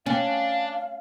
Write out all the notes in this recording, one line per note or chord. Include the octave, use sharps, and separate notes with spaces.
C#4 D4 F5